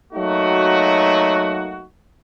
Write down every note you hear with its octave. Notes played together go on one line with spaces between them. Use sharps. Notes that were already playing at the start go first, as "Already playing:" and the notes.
F#3 A3 A#3 D#4 F#4